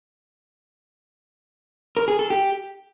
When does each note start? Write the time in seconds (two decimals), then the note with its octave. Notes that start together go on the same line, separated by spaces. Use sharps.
1.97 A#4
2.08 G#4
2.19 A4
2.30 G4